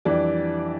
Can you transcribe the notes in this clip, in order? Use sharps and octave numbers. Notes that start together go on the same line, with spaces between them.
F2 E3 G3 D4 D5